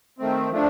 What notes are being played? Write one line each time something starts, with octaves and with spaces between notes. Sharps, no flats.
D#3 A3 C4
F3 A3 D4